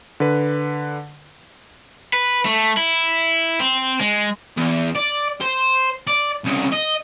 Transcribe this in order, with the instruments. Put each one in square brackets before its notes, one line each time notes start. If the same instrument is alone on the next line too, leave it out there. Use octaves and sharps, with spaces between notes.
[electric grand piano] D3 B4
[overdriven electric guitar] B4
A3
E4
C4
G#3
[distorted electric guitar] E2
D5
C5
D5
C2 C#3
D#5